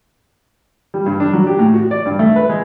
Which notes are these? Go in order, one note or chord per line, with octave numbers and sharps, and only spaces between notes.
G3
G2
D4
F#3
G4
A2
F#4
D5
G2
A3
B4
G#3